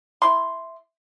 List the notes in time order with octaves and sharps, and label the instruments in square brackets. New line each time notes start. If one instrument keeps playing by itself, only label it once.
[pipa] E4 C6